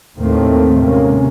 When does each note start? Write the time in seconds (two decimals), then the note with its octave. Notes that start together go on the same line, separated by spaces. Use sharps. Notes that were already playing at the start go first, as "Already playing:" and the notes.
0.18 D#2 A2 D#3 A3 A#3 C4
0.80 G#2 C3 A#3 C#4